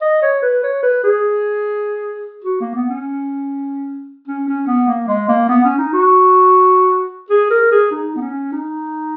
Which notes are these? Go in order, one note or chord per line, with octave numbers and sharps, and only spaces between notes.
D#5
C#5
B4
C#5
B4
G#4
F#4
A#3
B3
C#4
C#4
C#4
B3
A#3
G#3
A#3
B3
C#4
D#4
F#4
G#4
A#4
G#4
D#4
B3
C#4
D#4